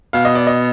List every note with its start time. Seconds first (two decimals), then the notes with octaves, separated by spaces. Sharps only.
0.13 B2 F5
0.25 D#5
0.35 D5
0.47 D#5